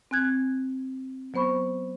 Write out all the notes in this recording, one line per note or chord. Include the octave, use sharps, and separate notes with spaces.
C4 G#5 F#6 G#6
F#3 B3 C5 B5 C#6